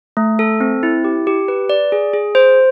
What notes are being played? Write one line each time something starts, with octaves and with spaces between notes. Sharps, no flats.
A3
A4
C4
E4
G4
G4
B4
D5
G#4
G#4
C5